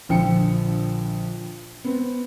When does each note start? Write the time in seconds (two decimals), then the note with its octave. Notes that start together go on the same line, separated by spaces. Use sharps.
0.09 A#1 D3 F3 G5 C#7
1.84 B3 C4